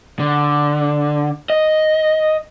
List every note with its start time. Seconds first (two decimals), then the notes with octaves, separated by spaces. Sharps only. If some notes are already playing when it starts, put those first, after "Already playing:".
0.19 D3
1.50 D#5